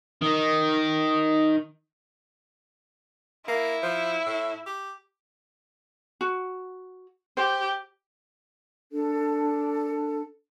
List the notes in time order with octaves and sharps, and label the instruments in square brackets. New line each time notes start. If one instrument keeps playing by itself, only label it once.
[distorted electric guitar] D#3 D#4
[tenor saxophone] A#3 [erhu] E4
[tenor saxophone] F3
A2
G4
[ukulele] F#4
[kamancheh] G4 [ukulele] C5
[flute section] D4 A4